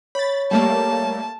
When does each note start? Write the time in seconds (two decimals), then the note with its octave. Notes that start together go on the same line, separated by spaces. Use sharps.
0.15 C#5 B5 A6
0.51 G3 A3 A#3 A5